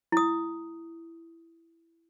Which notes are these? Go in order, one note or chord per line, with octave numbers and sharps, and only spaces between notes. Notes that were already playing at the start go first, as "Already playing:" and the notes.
E4 D#6